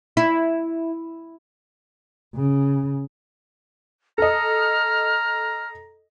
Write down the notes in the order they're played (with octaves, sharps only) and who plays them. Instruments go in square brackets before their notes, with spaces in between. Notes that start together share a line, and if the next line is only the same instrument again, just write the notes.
[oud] E4
[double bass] C#3
[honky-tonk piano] A4 D#5 [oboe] A#5 [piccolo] F6